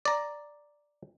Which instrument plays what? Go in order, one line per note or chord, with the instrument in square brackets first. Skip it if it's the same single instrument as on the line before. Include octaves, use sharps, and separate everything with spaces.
[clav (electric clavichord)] D5 A#5